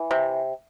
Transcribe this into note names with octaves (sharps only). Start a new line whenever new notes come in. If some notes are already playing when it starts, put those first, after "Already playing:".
Already playing: E3
C3